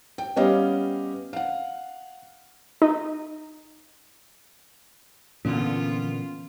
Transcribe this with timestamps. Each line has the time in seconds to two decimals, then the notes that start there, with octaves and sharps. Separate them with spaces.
0.18 G5
0.36 G3 B3 C#4 G4 D#5 F5
1.33 F5 F#5
2.82 D#4
5.45 A#2 D3 E3 B3 C#4 F4